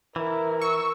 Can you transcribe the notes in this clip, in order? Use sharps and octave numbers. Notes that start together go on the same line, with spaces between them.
E3 E4 A#4
C#6 E6